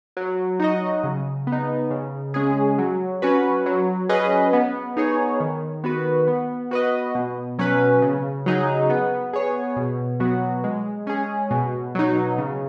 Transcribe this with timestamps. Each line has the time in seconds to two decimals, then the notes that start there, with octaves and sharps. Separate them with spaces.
0.17 F#3
0.59 D#4 F#4 D#5
1.04 C#3
1.47 B3
1.52 D#4
1.91 C#3
2.34 G#3 C#4 G#4
2.78 F#3
3.22 C#4 F#4 B4
3.66 F#3
4.09 C#4 G#4 B4 D#5
4.53 B3
4.97 D#4 G#4 C#5
5.40 D#3
5.84 B3 F#4 B4
6.28 B3
6.71 F#4 B4 D#5
7.15 B2
7.59 F#3 C#4 B4
8.02 C#3
8.46 F#3 D#4 G#4
8.90 B3
9.33 G#4 C#5
9.76 B2
10.20 F#3 B3 F#4
10.64 G#3
11.07 C#4 G#4
11.51 B2
11.95 F#3 D#4
12.38 C#3